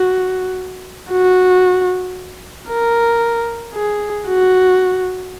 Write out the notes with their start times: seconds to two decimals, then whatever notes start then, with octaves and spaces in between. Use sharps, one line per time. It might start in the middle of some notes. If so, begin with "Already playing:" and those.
Already playing: F#4
1.11 F#4
2.69 A#4
3.74 G#4
4.27 F#4